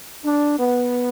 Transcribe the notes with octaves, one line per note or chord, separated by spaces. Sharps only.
D4
B3